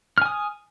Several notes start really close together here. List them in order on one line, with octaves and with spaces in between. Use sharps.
F6 G#5 D#6